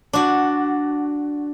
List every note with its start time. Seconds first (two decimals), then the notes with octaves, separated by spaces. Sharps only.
0.13 D4 F#4